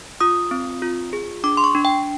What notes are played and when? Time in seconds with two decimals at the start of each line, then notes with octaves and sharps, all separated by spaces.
0.21 F4 D#6
0.51 C4
0.82 F4
1.13 G#4
1.44 D4 D6
1.57 C6
1.64 C#6
1.75 D4
1.85 G5